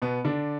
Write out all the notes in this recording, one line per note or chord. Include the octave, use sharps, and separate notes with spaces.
B2 B3
D3 D4